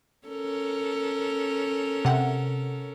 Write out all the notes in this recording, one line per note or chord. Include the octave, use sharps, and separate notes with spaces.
C#4 A4 A#4
C3 F#5